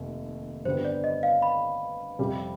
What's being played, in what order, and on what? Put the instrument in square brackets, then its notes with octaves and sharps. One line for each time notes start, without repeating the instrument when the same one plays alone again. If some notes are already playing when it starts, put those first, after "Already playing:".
Already playing: [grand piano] F1 D#2
[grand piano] G2 D3 G3 B3 [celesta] C5
[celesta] D5
D#5
F5
B5
[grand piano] F2 C3 G3